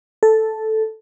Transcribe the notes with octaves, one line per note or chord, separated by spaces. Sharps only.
A4